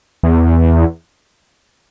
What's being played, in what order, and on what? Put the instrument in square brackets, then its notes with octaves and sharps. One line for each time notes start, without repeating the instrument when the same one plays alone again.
[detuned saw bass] E2